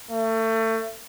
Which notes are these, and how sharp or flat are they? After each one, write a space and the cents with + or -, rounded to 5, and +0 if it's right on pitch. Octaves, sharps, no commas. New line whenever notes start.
A3 +30